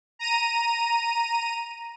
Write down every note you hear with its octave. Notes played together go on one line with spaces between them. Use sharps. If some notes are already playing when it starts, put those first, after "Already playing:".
A#5 D#7